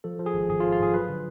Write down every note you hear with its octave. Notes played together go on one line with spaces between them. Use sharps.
F3 A4
F3
G#4
G#1
G#1 G#4
F4
F3
F4
G#2 G#4
F#3 B4
D3